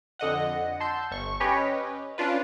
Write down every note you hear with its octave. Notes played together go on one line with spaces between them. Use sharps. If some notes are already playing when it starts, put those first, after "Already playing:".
F2 D3 D#5 F#5
A5 C6 E6 G6
G1 C#6
C#4 G4 B4 C#5 D#5
C#4 D4 F4 B4